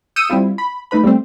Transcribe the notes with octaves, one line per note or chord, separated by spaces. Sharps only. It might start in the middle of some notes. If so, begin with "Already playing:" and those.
D#6 E6 G6 C#7 D#7 E7
G3 C4 E4 F4
B5
A3 D#4 B4 B5
G3 A3 C4